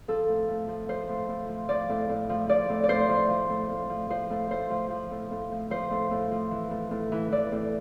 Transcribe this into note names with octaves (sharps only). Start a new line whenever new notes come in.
F3 A4
A2
A2
F3
F3 C5
A2
A2
F3
F3 D5
A2
A2
F3
F3 D5
A2
D5
A2 C5
F3
F3
A2
A2
F3
F3 C5
A2
A2 C5
F3
F3
A2
A2
F3
F3 C5
A2
A2
F3
E3
A2
A2
E3
E3 D5
A2